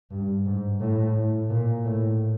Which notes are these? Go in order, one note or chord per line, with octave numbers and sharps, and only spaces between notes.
G2
G#2
A2
A#2
A2